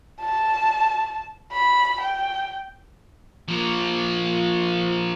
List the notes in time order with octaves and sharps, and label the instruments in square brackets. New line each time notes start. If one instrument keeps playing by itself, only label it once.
[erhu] A5
B5
G5
[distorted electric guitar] F3 A#3